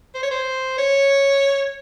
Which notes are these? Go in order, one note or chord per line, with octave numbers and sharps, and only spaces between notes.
C5
C#5
C5
C#5